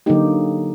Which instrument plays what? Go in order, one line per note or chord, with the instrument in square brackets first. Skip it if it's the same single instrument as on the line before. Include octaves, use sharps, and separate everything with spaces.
[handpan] D3 F#3 A#3 D#4 G4